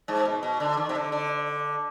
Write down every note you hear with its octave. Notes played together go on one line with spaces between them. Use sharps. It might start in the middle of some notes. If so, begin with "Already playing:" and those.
G#2
B2
B2
D3
D#3
C3
D3
D3